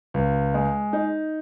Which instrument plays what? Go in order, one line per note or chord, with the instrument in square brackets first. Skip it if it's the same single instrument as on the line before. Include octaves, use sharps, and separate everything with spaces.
[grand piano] C#2
G#3
D#4